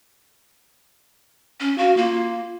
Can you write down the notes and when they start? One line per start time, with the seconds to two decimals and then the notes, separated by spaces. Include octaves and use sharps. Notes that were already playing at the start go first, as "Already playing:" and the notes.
1.60 C#4
1.78 F#4 F5
1.97 A#3 F4